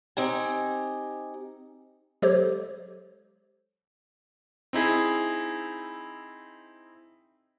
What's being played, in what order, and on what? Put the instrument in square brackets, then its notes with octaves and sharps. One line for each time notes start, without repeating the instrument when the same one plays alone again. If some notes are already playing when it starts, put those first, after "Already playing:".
[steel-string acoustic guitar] C4 D#4 G4 G#5
[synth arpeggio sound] F#3 G#3 G4 A4 C5 C#5
[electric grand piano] C4 D#4 E4 G#4